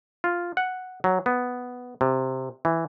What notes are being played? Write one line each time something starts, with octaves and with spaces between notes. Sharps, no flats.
F4
F#5
F#3
B3
C3
E3